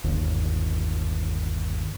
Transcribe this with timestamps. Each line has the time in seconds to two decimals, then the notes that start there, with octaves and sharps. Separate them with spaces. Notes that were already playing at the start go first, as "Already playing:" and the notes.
0.04 G1 D#2